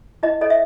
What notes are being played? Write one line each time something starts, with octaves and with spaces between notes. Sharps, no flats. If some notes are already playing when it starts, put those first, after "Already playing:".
E4 D#5
A4 C#5 D#5
E5